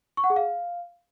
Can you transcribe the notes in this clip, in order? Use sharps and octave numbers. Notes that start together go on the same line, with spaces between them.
C#6
F#5
G#4
F5